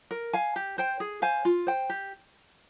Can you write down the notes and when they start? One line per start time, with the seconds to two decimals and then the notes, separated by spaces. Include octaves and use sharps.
0.11 A#4
0.33 F5 G#5
0.56 G4
0.78 C5 G5
1.00 G#4
1.22 C5 F5 G#5
1.45 F4
1.67 C5 G5
1.90 G4